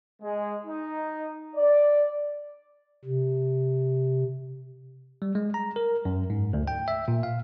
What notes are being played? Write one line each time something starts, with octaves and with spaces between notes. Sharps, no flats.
G#3
D#4
D5
C3
G3
G#3
A#5
A#4
F#2
G#2
D2
G5
E5
A#2
F5